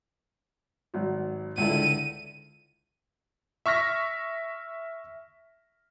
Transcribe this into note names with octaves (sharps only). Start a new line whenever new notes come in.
G#1 F#3
C#2 D3 E4 D#7
E5 C#6 F6 A#6 B6